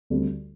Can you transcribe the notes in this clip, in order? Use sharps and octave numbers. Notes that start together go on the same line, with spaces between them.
D2 D3 G3 C4